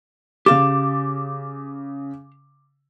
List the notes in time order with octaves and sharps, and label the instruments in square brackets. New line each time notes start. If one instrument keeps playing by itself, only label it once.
[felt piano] C#3 A6 E7 [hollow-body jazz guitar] G4 F5 [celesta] D6